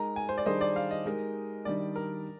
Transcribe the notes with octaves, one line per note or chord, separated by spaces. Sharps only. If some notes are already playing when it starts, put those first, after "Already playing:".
Already playing: G#3 D#4 A#4 A#5
G#5
C5
D5
D#3 G3 D4 G#4 C5 D#5
D5
F5
D#5
G#3 D#4 G4 A#4
D#3 G3 D4 D5
A#4